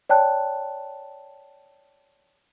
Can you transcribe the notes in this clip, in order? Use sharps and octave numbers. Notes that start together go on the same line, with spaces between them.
C#5 D5 G5 A5 F#6